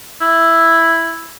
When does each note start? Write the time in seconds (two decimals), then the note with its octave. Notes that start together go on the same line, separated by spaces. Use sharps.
0.21 E4